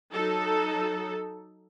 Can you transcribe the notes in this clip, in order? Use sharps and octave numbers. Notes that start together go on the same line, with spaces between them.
F#3 D#4 A4